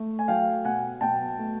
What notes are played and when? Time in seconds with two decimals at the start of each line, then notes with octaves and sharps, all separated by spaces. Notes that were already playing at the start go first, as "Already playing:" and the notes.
Already playing: A3
0.19 G#5
0.28 F#3 F5 G5
0.65 B2 F#5 G#5
1.01 B2 G5 A5
1.38 A3